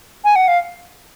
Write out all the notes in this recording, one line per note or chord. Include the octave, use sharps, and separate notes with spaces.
G#5
F#5
F5